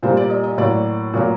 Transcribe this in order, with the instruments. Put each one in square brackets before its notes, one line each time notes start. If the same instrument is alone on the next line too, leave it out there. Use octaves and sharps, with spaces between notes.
[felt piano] A#2 G3 A#3 C5
D5
D#5
D#5
A2 F#3 A#3 D5
A#2 F#3 A#3